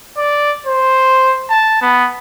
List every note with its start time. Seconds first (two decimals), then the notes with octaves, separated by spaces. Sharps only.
0.18 D5
0.66 C5
1.50 A5
1.82 B3